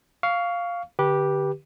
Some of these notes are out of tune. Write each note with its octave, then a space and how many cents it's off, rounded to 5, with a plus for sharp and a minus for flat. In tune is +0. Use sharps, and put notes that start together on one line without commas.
F5 +0 C#6 +30
D3 +0 G4 +0 B4 -25